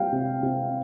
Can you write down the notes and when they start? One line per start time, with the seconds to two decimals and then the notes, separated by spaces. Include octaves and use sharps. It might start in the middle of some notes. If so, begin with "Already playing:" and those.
Already playing: G3 F5 G5
0.12 C3
0.43 C3